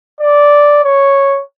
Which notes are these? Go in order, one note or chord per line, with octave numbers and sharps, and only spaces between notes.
D5
C#5